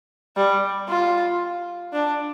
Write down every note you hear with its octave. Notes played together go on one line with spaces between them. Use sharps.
G3
F4
D4